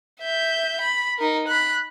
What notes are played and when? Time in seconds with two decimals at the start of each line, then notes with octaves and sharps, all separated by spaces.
0.20 E5 G6
0.80 B5
1.19 D#4 A#4
1.47 B5 F#6